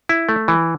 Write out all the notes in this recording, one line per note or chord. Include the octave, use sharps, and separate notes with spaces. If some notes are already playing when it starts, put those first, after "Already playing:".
E4
A3
E3